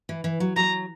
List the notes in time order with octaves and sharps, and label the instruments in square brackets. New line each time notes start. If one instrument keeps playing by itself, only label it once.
[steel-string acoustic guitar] E3
E3
F#3
[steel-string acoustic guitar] F#3 [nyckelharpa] A#5